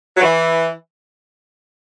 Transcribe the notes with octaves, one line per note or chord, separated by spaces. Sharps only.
F#3
E3